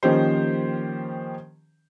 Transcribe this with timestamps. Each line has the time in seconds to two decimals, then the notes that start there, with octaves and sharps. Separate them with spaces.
0.03 D#3 F3 A#3 C#4 G4 C5